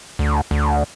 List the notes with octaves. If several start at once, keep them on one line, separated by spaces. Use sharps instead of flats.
D2
D2